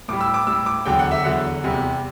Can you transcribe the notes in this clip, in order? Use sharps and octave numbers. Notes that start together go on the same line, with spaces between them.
A2 G3 D6
E6
D6
A2 G3 E6
D6
E2 D3 F#3 G5
F#5
E5
E2 D3 F#3 F#5
E2 C3 G3